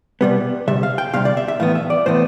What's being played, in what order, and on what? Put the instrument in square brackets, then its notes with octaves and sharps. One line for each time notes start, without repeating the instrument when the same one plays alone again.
[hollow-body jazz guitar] C2 B2 G3 B3
D2 C3 G3 E5
F5
G5
D2 C3 G3 F5
D5
E5
E5
A2 E3 B3 F5
E5
D5
A2 E3 B3 C5